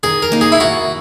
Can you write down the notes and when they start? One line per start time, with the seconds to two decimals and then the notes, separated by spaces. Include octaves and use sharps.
0.03 D#3 G#4
0.22 A#4
0.32 A#3 D#4
0.41 G#4
0.52 E4
0.60 D#3 F#4